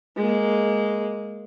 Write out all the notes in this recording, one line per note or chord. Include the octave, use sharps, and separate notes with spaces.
G#3 A#3